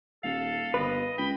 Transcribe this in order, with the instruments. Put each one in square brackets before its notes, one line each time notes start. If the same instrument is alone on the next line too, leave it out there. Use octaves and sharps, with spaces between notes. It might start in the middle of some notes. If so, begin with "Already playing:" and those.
[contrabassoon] D#1 [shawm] A4 [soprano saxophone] F5
[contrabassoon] G1 [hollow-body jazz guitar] B4 [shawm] D#5
[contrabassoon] C#2 [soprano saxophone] G5 [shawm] B5